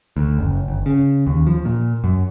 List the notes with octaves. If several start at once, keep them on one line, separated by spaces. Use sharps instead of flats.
D2
F#1
G1
C#3
D#2
F3
A#2
F#2